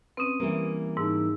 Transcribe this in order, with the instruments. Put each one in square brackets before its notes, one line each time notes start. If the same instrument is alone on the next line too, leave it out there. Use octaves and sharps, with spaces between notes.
[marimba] C4 C#4 [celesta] B4 D#6 D#7
[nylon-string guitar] E3 G3 A#3
[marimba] G#2 [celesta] D#4 E6